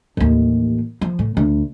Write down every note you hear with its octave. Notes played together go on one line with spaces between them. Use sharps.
A1 D#2
F3
A2
D2